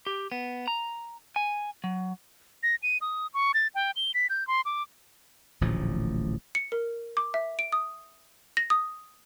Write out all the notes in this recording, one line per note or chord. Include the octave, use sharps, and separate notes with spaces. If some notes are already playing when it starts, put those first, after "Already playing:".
G4
B3
A#5
G#5
F#3
A#6
D#7
D#6
C#6
A6
G5
G7
B6
G6
C6
D6
D1 A1 A#2 F3
C#7
A#4
D6
E5
D7
D#6
A#6
D#6